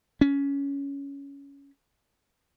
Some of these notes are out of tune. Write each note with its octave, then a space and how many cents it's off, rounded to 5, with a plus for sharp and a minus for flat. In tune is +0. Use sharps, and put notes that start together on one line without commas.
C#4 +15